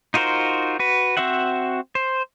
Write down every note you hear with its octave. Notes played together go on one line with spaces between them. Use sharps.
D#4 F4 F#4 A#4 C5
F#4 B4
C4 F#4 C5 E5 F#5
C5